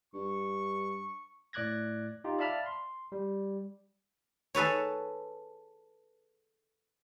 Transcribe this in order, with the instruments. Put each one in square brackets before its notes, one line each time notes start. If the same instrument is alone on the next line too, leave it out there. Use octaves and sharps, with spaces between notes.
[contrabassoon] G2 [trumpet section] C#6
[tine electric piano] A2 D5 D6 F#6 G#6 A#6
D#4 F4 G4
D5 E5 F5 A5 B5 F6
C6
G3
[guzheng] G#4 A4 B4 C#5